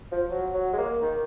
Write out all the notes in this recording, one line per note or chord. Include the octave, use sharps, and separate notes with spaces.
F3
F#3
F#3
G#3
A#3
D#3